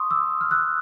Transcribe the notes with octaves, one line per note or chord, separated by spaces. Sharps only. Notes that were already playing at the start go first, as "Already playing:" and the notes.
Already playing: C6 C#6 D#6
D6 E6
F6
E6 F#6